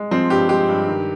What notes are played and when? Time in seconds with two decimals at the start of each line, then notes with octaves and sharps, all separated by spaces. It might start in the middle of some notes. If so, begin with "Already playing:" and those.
Already playing: G#3
0.11 F3 C4
0.30 G2 G4
0.49 G#3 G4
0.69 G2
0.88 D#3